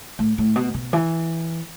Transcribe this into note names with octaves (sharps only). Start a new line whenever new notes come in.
A2
A2
B2
B2
E3